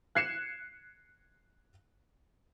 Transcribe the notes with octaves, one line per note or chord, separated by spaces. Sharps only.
F#6 G#6 C7 C#7 E7